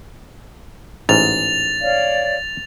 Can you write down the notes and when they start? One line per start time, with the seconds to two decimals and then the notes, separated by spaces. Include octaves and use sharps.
1.09 A1 G#2 A6 F7
1.80 C#5 D5 F5